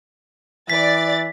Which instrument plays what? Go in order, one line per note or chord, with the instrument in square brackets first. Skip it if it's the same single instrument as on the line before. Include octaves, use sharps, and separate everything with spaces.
[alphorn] E3 [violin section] D5 A6 [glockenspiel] B6